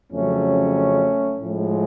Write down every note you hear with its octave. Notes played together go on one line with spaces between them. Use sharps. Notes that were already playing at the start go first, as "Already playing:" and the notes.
F2 C#3 F#3 A3 C#4
A2 F3 G#3